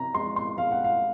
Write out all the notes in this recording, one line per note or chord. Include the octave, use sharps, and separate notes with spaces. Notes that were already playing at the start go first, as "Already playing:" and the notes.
Already playing: C3 A#5
G#3 C6
C6
G#3 F5
F#5
F5